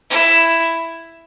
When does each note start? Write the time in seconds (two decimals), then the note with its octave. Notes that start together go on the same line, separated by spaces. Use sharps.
0.10 E4